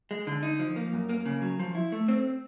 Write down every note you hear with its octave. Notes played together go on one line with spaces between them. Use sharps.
G#3
D3
D#4
F3
A#3
F#2
A#3
C#3
F#3
F3
E4
A3
C4